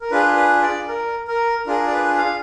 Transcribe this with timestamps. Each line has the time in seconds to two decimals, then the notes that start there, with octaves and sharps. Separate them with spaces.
0.01 A#4
0.11 D4 F4 G#4 B4
0.36 B4
0.62 D5
0.88 A#4
1.28 A#4
1.66 D4 F4 G#4 A#4
1.88 D5
1.92 B4
2.18 F5